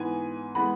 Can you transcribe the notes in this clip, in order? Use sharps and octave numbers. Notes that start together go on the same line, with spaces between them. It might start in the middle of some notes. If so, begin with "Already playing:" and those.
Already playing: G#2 E3 B3 G#5
E3 G#3 B3 B5